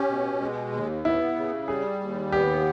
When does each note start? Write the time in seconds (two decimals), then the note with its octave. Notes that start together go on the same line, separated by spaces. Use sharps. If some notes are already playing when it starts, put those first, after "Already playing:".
Already playing: C#4 G4
0.09 B2
0.41 G#3
0.72 D#2
1.05 B3 E4
1.36 C#3
1.68 G3 G#4
2.01 D#2
2.32 B3 G4